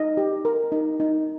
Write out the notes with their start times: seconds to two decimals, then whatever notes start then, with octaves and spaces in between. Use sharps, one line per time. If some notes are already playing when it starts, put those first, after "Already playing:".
Already playing: D#4 D#5
0.17 G4
0.45 A#4
0.72 D#4
1.00 D#4